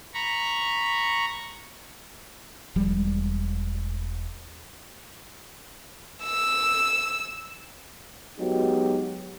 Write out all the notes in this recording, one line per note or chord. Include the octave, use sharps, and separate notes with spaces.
A#5 B5 C#6
E1 F3 G3 G#3
E6
F#3 G#3 B3 D#4 F#4 G4